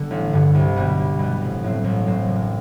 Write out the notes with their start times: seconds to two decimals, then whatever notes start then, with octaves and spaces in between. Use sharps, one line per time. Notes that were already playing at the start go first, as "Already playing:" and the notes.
Already playing: D3 G3 B3 A4
0.11 A1
0.33 G2 D3
0.55 C2
0.76 B2 G3 B3
0.97 C2
1.19 B2 G3 B3
1.41 A1
1.63 A2 F#3 C4
1.84 A1
2.06 A2 F#3 C4
2.27 F#1